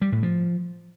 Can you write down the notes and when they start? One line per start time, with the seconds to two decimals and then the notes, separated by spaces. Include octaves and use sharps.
0.02 G3
0.12 A2
0.23 F3